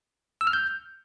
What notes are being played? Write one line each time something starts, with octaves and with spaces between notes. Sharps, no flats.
E6
F6
G6